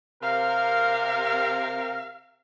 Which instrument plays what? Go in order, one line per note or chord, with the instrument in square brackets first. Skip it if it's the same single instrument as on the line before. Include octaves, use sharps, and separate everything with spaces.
[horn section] C3 A#4 [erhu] F5